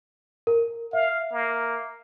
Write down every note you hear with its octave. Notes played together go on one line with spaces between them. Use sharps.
A#4
E5 F5
A#3